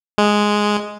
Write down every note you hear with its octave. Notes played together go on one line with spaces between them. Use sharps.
G#3